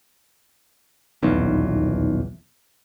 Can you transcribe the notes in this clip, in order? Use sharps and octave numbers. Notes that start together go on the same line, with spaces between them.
D#1 B1 E2